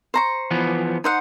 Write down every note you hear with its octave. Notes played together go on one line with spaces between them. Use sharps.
C5 A#5 C#6
E3 F3 B3
D#4 C5 F#5